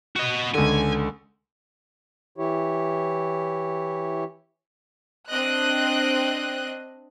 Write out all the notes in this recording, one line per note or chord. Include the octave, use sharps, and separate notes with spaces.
F#4 D#5
C#2 D3 G#5
E3 E4 G4 C#5
C4 D4 D#5 F#6